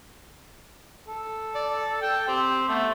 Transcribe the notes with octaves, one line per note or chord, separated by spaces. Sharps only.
A4
D5
A4 G5
C4 G4
A3 B3